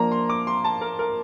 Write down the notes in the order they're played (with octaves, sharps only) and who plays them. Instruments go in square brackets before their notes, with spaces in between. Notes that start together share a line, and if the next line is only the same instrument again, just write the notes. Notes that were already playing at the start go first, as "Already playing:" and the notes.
Already playing: [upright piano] F3 A#3 D4 [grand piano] A#5
[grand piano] C6
D6
C6
A5
A#4
A#4